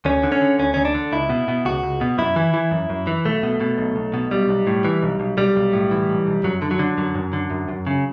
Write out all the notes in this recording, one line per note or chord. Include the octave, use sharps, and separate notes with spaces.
D2 C#4
D3
C#4
D3
D2 C#4
D2 C#4
D4
D3
C#2 E4
B2
B2
C#2 F#4
C#2
B2
F#2 E4
E3
E3
F#2
F#2
E3
B1 A3
B2
B2
B1
B1
B2
B1 G3
B1
A2
E3
B1
B1
B1 G3
B1
A2
E3
B1
B1
F#2 F#3
D3
F#3
D3
F#2 F#3
F#2
D3
F#2
F#2
C#3